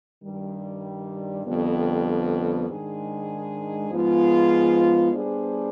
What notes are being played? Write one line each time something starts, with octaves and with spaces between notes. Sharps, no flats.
G2 D#3 G3
F2 D3 G3 B3
G#2 D#3 G#3 D4 G#4
G#2 F3 B3 F4 G#4
G3 B3 D4 G#4 C5